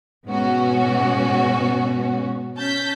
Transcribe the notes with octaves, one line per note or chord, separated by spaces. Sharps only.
G#2 B2 B3 C#4 F#4
C#4 A5 G6 B6